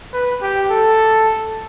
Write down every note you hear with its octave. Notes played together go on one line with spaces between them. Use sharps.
B4
G4
A4